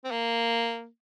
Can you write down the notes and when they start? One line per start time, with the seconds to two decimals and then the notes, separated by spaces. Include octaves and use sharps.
0.04 C4
0.11 A#3